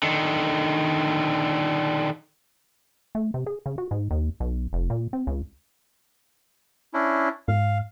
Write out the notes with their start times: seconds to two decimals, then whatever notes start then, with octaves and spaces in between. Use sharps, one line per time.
0.03 D3 D#3
3.15 A3
3.34 C3
3.46 G#4
3.66 C#3
3.78 F#4
3.91 G#2
4.11 D#2
4.40 B1
4.73 F1
4.90 A#2
5.13 C4
5.27 C#2
6.94 C#4 D4 E4
7.48 G#2 F5